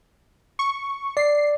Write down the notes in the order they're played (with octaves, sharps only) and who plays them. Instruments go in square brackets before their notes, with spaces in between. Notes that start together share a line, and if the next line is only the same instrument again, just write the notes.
[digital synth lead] C#6
[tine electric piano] D5 [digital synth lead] C7